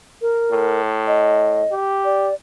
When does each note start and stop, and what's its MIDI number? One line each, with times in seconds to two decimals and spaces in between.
0.22 0.80 70
0.51 1.63 45
1.07 1.74 75
1.71 2.29 67
2.05 2.34 74